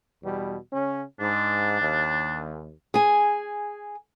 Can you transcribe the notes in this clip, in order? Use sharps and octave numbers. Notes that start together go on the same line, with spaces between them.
E2 B2 G3
C#3 C#4
G#2 D4
D#2
G#4 G#5